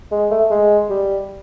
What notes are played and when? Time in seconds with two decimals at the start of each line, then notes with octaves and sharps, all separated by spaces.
0.12 G#3
0.31 A3
0.51 G#3
0.90 G3